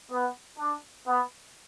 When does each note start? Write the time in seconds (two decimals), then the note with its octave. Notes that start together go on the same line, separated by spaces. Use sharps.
0.12 B3
0.59 D4
1.06 B3